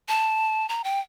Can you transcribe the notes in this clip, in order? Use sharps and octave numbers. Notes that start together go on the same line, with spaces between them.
A5
A#5
G5